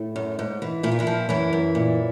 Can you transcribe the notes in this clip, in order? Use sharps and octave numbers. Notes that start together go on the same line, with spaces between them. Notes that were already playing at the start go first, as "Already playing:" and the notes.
Already playing: A2 A3
F#2
G#2
E3
A#2 E4
F4
E3 E4
F3
F#2 E3 E4
F#2
A#2